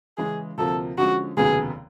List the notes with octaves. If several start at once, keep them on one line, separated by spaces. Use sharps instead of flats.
C#3 E3 G#3 C#4 G#4
D2 C3 F3 A#3 A4
D3 F3 G#3 C#4 F#4
F1 D#2 C#3 F#3 B3 G#4